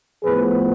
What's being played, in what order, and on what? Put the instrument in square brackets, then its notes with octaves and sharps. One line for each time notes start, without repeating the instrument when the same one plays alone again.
[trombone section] A2 F3 B3 G#4 B4